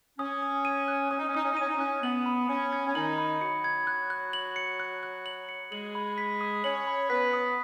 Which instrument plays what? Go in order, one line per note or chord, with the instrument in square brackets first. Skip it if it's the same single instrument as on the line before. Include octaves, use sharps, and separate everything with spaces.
[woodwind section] C#4 [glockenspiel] D#6
[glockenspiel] D#6
D#7
F#6
[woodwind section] C#4 [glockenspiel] D#6
[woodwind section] D#4
C#4
[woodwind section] D#4 [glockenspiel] D#6
[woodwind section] C#4
D#4
[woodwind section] C#4 [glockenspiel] D#7
[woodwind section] D#4
[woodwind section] C#4 [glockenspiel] F#6
[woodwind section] B3 [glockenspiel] F#7
[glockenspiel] B5
[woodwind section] C#4 [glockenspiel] C#7
[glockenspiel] G#6
[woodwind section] C#4
[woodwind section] D#3 D#4 [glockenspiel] F#7
[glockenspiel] B5
[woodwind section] F#3 F#4 [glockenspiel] C#7
[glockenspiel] G#6
F#6
F#6
F#7
C#7
F#6
F#6
F#7
C#7
[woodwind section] G#3 G#4 [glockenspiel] F#7
[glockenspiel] B5
B6
D#6
[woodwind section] C#4 C#5 [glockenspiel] F#7
[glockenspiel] B5
[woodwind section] B3 B4 [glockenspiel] B6
[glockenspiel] D#6